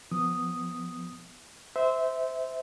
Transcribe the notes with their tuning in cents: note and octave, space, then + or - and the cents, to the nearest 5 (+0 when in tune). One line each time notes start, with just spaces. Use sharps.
F3 +0 B3 +5 D#6 +0
C5 -20 E5 -20